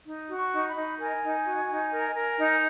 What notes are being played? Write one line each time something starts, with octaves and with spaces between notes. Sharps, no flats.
D#4
F#4
C#6
D#4
B5
D#4
A#4 G#5
D#4
F#4
D#4
A#4
A#4
D#4